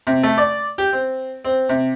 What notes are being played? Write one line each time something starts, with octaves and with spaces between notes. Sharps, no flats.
C3
A3
D5
G4
C4
C4
C3